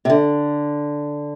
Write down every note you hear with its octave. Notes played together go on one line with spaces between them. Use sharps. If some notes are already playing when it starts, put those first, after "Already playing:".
C3
D3